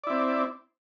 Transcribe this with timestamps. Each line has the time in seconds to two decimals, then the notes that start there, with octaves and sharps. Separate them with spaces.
0.04 D5
0.07 E4
0.10 C4